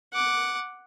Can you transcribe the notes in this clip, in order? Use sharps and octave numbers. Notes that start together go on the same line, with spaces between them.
F#5 D6